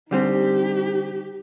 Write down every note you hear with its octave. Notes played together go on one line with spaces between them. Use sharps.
D3 G3 C4 D#4 G4